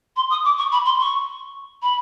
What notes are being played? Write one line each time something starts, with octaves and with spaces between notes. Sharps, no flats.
C6
D#6
D6
C#6
B5
C6
C#6
B5